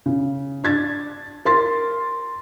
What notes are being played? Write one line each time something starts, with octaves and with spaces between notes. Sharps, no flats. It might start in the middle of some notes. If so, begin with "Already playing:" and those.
C#3
D4 G#6 A6
A#4 C6 A6